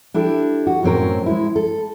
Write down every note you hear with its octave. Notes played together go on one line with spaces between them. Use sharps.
D4 E4 G4 A4
F#4
F#2 A2 F#3 C4 C#4 A#4
G#3 E4
A4